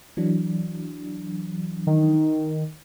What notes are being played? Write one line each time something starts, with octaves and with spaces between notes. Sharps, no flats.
E3 F#3 D4
D#3